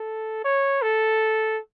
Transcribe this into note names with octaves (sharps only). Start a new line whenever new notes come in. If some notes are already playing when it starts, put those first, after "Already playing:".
Already playing: A4
C#5
A4